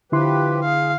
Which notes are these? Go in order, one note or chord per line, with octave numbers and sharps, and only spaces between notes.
D3 F3 E4 G4 B4 C6
G#4 F5